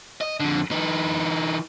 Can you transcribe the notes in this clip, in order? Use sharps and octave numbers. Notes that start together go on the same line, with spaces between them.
D#5
F2 D3
E3 D#4